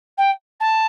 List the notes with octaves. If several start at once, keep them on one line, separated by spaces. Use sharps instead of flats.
G5
A5